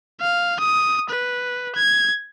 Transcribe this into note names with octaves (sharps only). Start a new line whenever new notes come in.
F5
D#6
B4
G#6